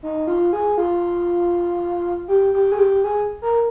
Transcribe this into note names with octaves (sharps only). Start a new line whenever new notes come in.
D#4
F4
G#4
F4
G4
G4
G#4
G4
G#4
A#4